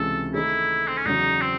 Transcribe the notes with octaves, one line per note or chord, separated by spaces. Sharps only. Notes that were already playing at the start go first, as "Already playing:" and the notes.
Already playing: C#2 C3 E3 G#3 C#4 A4
D#3 A3 D#4 E4 G#4 C#5
C4
C#4
E2 C#3 F#3 D#4
C4